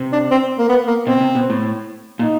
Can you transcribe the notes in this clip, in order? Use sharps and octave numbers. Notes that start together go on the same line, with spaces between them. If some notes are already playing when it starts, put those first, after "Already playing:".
Already playing: C3
D4
C4
A#3
B3
A#3
B2 C4
C3
B2
A2
A#2 D#4